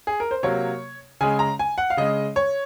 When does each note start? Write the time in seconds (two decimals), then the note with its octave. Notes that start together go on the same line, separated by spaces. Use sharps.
0.07 G#4
0.20 A#4
0.31 C5
0.43 C3 F#3 A#3 C#5
1.21 C#3 G#3 G#5
1.39 A#5
1.59 G#5
1.78 F#5
1.90 F5
1.97 C#3 G#3 D#5
2.36 C#5